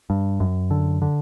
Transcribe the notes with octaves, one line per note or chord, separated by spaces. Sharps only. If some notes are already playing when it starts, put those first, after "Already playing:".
G2
F#2
D3
D3